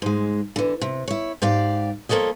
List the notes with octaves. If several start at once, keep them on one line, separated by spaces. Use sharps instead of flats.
G#2 G#3
D3 E3
C3
E4 C#5
G#2 G4 D5 F5
F3 A#3 A4 C#5 D#5